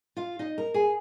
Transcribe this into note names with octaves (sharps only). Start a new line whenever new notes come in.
F4 F5
D#4 D#5
A#4 A#5
G#4 G#5